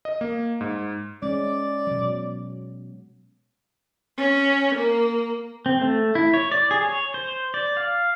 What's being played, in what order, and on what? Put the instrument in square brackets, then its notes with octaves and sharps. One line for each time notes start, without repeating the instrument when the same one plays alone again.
[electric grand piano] D#5
A#3
G#2
[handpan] G#3 C#4 [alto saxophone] D5
[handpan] B2 F#3
[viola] C#4
A#3
[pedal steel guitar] C4
A3
E4
C#5
D5
G#4
C#5
C5
D5
F5